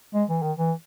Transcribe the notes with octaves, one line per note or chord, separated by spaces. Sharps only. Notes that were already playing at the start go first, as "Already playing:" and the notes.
G#3
E3
D#3
E3